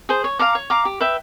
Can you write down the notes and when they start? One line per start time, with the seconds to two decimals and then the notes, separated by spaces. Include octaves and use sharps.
0.09 G#4 C5
0.24 C#5
0.39 F5 A#5 D6
0.55 C#5
0.70 F5 A#5 D6
0.85 G4
1.01 B4 E5 G5